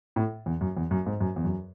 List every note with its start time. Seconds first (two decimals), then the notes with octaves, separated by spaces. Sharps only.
0.16 A2
0.46 E2
0.61 F#2
0.77 E2
0.91 F#2
1.06 G#2
1.21 F#2
1.36 E2
1.44 F#2